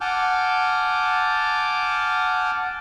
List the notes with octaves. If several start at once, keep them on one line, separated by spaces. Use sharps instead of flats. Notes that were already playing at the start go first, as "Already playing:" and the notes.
F#5 G#5 A5 D6 F6 G6